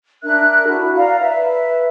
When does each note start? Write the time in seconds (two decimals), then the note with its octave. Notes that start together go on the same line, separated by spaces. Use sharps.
0.23 D4 A#4 E5 F#6
0.67 E4 F#4
0.96 D5 F5 A#5
1.20 B4 E5